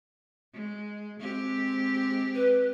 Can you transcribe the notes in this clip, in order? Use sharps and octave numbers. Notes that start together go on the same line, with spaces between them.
G#3
G#3 C4 G4
B4